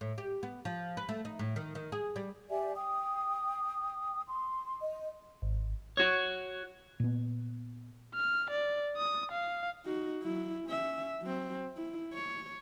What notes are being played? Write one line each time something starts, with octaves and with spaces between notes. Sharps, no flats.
A2
G4
B3
F3
B4
A3
D#4
A2
D#3
D#3
G#4
G3
G4 D5 E5 G#5
G5 D#6
C6
D#5
G#1
F#4 C#5
A#2 B3
F6
D5
D#6
F5
D#4 F#4
F#3 E4
C#4 E5
F#3 C4
E4
C#5